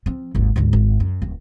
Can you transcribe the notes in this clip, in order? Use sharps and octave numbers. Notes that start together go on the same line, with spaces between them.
F3 C4
G#1 D#2
D2 G#2
G#1
F#2
D1